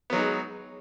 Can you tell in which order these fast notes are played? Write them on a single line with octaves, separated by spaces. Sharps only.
B3 F#3 D#4 G#3